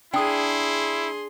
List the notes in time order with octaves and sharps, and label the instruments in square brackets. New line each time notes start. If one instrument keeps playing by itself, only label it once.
[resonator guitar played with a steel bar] D4 [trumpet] E4 [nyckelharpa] G#4 C6 [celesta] G5 D#6